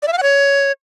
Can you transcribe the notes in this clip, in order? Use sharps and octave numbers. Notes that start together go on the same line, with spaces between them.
D5
E5
F5
F#5
C#5